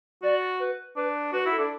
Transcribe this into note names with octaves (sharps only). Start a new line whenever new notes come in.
F#4 D5
B4
D4 B4
F#4 B4
E4
A4
D4